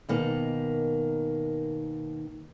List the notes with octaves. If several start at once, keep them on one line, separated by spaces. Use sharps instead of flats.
B2 D#3 A#3 G#5